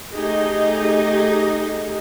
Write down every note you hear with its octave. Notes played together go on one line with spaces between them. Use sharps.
A3 D#4 G4 G#4 D#5